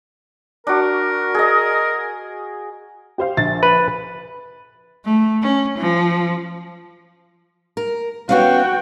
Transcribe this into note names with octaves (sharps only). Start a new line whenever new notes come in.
D4 F#4 A#4
G#4 D#5
G4 C5 F5
A#1 A6
B4
A3
C#4
F3
A#4
B3 C#4 F#4 F5 G5